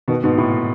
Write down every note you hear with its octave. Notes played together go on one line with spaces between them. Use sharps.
B2 D#3
G#2 B2
A2